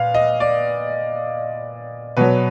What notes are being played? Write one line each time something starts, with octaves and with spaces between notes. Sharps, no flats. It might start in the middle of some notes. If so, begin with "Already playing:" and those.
Already playing: A#2 B4 F5
D#5
D5
B2 F#3 B4